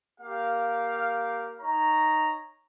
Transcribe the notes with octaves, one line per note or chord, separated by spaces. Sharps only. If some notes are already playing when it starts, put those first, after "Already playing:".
A#3 G4 F5
D#4 C#5 A#5